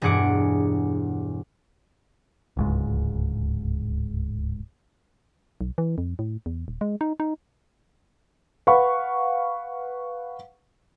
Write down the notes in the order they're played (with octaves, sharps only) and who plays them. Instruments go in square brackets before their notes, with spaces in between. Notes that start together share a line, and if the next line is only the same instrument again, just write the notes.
[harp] E1 G2 G#4 F#5 D6 D7
[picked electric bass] D1 C#2 G#2
[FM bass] B1
E3
F2
A2
E2
D#1
G#3
D#4
D#4
[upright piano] B4 F5 F#5 B5 C#6